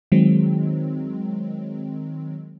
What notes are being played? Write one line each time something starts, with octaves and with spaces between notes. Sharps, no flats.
D#3 F#3 G#3 C4